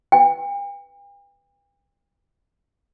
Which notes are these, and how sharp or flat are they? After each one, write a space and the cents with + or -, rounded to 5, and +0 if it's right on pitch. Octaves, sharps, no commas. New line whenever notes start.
G5 +40